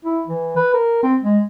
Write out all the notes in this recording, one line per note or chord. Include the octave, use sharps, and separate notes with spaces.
E4
E3
B4
A#4
C4
G#3